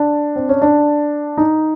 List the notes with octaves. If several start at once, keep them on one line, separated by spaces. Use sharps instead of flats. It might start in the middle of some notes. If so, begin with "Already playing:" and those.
Already playing: D4
C4
C#4
D4
D#4